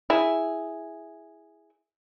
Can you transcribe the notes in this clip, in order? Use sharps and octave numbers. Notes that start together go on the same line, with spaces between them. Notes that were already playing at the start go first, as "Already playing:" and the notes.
E4 G#4